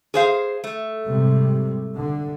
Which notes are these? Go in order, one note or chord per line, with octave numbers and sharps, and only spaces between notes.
G#4 C5 F5
A3
G#2 C3 G3
D3